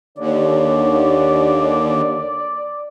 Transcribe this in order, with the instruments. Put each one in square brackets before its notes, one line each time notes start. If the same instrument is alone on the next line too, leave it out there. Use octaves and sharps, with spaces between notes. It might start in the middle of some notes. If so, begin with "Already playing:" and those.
[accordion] D#2 [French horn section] D3 C#5 [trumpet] D5